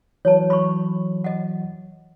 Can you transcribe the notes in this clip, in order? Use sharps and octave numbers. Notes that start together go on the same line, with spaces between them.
E3 F#3 C#5 A5
B5 C#6
D#5 F#5